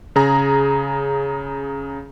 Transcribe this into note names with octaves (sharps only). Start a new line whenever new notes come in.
C#3 G#4 A#5